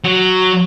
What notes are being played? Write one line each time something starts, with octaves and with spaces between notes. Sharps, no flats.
F#3